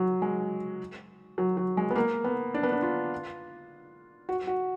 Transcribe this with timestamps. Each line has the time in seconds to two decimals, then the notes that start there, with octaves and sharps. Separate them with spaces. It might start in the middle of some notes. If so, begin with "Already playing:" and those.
Already playing: F#3
0.22 G#3
1.38 F#3
1.57 F#3
1.77 G#3
1.91 B3
1.95 A#3
2.24 B3
2.54 D4
2.63 B3
2.72 D4
2.82 F4
4.29 F#4
4.47 F#4